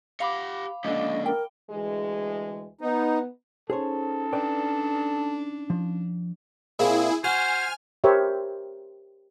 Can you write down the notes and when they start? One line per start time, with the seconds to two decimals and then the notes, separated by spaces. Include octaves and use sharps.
0.20 G4 F5 F#5 B5 D6
0.85 C#2 D3 F3 A#3 D#5
1.26 A#4 G5
1.71 D2 E3 G#3
2.81 B3 D#4
3.70 C#4 D#4 G#4 A4 C5 C#5
4.33 D4 B4 D5 G5
5.70 F3
6.79 A#2 A#3 C4 E4 G#4
7.24 F#4 C5 G#5 F6
8.04 G4 A#4 C5 C#5 E5